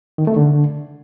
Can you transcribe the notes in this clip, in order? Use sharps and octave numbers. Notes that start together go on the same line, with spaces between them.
D#3
A3
D3